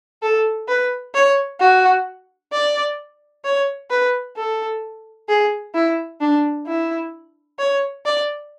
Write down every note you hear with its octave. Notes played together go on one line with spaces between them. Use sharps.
A4
B4
C#5
F#4
D5
C#5
B4
A4
G#4
E4
D4
E4
C#5
D5